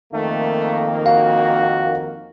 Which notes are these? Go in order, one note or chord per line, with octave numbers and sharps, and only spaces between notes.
F2 D#3 A3 A#3
F#4 F5